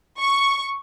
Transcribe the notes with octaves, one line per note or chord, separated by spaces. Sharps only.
C#6